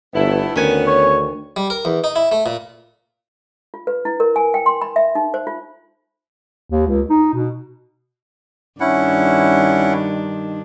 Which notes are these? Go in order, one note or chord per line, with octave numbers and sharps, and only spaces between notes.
G1 A3 B3 E4
D2 D#3 B3 C#4 G#5
C#5
G3
A#4
E2
D#4
E4
A3
A#2
F4
B4
E4
A#4
G#5
G5
C6
B5
E5
D#4
C5
F4
D#2
C#2
D#4
B2
G2 D#3 C#4 D4 E4 F#5